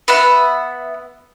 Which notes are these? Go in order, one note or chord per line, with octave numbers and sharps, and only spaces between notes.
B3 E5 F#5